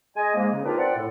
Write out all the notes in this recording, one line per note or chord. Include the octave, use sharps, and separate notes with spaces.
G#3 D#5 G#5
G#2 G#3 A#3
C#3
C4 D4 D#4 F4 A#4 B4
C4 D5 F#5
A2 A4